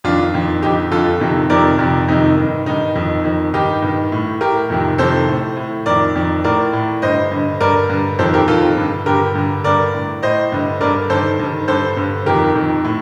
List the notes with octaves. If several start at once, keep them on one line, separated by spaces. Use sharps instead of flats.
F2 D#3 D4 F4
F2 D#3
F2 D3 D#4 G4
F2 D3 F4 A4
F2 C3 D#3
F2 C3 D#3 A#4 D5
F2 C3 D#3
F2 C3 D#3 D#4
G2 D#3
G2 D#3 D#4
F2 D#3
F2 D#3
G2 D#3 D#4 G4
G2 D#3
A2
A2 G4 A#4
F2 C3 D#3
F2 C3 D#3 A4 C5
A2
A2
F2 D#3 A#4 D5
F2 D#3
A2 A#4 D5
A2
G2 D3 C5 D#5
G2 D3
G2 D3 A#4 D5
G2 D3
F2 D#3 A4 C5
G4 A#4
F2 D#3 F4 A4
G2 D3
G2 D3 G4 A#4
G2 D3
G2 D3 A#4 D5
A2
A2 C5 D#5
G2 D3
G2 D3 A#4 D5
G2 D#3 A4 C5
G2 D#3
G2 D3 A4 C5
G2 D3
F2 D#3 G4 A#4
F2 D#3
A2